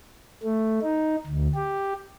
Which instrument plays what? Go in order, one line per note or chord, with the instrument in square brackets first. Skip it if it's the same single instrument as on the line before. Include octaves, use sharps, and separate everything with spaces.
[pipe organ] A3
D#4
D2
G4